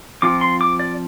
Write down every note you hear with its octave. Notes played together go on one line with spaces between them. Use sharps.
F3 C4 F4 D6
C6
D6
D5